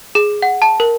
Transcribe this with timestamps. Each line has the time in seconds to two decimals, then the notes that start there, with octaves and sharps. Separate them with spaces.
0.15 G#4
0.42 F#5
0.62 A5
0.80 A#4